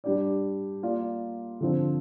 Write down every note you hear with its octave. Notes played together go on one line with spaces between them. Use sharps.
G3 D4 G4 D5
A#3 F4 D5
D3 F3 C4